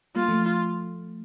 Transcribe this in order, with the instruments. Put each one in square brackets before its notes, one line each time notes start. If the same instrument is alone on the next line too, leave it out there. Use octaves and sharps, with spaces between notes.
[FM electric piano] G3 A#3 [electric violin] F4
[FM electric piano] F3 A3